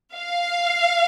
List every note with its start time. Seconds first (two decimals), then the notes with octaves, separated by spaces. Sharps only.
0.16 F5